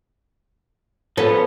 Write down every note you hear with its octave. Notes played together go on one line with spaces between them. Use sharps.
F3 B3 C#4 A4 B4